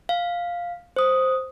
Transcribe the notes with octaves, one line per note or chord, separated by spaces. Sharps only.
F5
C5 D#6